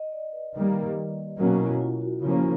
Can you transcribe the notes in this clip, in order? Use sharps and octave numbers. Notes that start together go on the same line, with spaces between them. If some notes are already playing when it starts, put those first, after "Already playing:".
Already playing: D#5
D5
B4
D#3 G3 A#3
B2 F#3 A#3 C#4 A#4
E4
F4
F#4
C#3 F3 A#3 C#4 E4